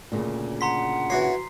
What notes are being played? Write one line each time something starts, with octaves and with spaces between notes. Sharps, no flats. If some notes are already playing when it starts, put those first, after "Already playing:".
D2 A#2 C#3
F#5 A#5 C6 B6
E3 F#4 C#5 C7